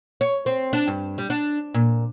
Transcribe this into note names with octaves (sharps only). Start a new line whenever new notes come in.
C#5
C4
D4
G2
G3
D4
A#2